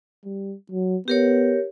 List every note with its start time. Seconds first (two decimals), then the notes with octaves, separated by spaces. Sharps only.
0.25 G3
0.72 F#3
1.08 B3 G4 A#4 C#5